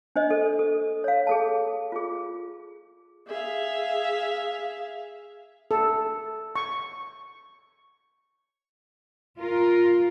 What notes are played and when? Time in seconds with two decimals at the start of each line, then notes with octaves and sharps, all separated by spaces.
0.16 D4 C5 D#5
0.31 A4
0.59 A4
1.04 C#5 F5
1.27 G#4 A4 A5
1.92 F4 G#4
3.27 G#4 E5 F5
5.71 A4
6.56 C#6
9.39 F4 A#4